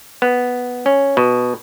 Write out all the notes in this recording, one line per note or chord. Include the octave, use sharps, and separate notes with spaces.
B3
C#4
B2